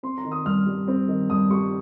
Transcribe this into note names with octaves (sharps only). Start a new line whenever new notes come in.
C4 C6
A#5
D#3
D#6
G2 F6
G3
C4
D#3
G2 D#6
G3 C#6